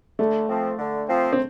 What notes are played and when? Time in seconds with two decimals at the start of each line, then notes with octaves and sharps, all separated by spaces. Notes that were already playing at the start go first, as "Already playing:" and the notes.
0.19 D3 A3
0.48 F3 C4
0.79 D3
1.08 F3 C4
1.33 C4